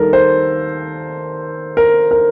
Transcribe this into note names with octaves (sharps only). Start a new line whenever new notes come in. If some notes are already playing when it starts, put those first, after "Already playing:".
Already playing: D#2 D#3 G3 A4 A#4
C5
A#4
A#4